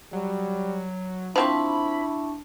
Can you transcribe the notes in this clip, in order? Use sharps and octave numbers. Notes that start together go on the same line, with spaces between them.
F#3 G3
F3 C4 D4 E4 A5 B5 C#6